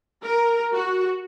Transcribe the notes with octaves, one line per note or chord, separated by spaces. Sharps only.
A#4
F#4